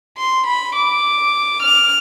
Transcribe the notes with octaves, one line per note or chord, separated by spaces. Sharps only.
C6
B5
D6
F6